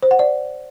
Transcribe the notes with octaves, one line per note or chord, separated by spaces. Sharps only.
C5
F#5
D5